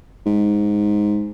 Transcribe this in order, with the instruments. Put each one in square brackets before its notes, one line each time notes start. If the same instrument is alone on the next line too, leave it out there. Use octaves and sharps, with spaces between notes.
[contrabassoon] G#2